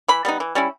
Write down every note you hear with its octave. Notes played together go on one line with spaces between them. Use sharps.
E3 B5
G3 B3 D#4
E3
G3 C#4 E4